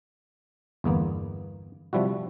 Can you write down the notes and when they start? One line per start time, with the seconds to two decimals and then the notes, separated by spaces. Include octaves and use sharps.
0.84 G1 E2 A#3 B3
1.93 C3 F3 G3 E4 F#4